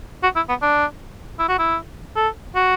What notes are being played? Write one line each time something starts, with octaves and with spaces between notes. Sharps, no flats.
F#4
E4
B3
D4
E4
F#4
E4
A4
F#4